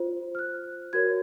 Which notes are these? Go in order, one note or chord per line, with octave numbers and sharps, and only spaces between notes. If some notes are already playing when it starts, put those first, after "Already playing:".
Already playing: F4 C5
F6
F#6
F#4 A#4 C#5 G#6